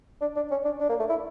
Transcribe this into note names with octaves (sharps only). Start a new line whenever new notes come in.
D4
D4
C#4
D4
D4
A#3
A3
E4